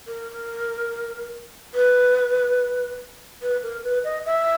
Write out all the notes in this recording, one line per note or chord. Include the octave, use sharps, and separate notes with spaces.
A#4
B4
B4
A#4
B4
D#5
E5